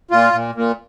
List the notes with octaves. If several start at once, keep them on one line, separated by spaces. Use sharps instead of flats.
A#2 F4
A#2
A#2